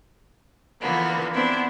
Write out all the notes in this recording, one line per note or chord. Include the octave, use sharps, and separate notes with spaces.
D3 E3 F3 A#3 B3
B3 C4 D4 E4